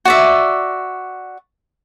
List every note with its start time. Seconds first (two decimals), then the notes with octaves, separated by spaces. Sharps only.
0.05 F#4 D5 E5